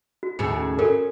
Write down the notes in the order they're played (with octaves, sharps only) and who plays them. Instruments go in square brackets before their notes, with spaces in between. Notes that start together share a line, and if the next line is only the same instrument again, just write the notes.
[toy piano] F#4
[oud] D#2 A2 C#3
[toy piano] A#5
[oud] C#4 [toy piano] F#4 A4 A#4